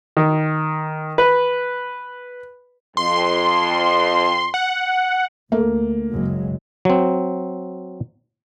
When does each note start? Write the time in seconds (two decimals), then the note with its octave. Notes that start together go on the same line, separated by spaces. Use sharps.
0.17 D#3
1.18 B4
2.97 F2 C6
4.54 F#5
5.52 D2 A3 A#3
6.13 F#1 F#3 G#3
6.85 F#3 C4